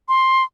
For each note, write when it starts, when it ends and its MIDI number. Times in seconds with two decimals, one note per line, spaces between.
0.08 0.44 84